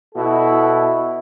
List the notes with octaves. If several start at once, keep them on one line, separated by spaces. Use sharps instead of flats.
B2 E4 F#4 A4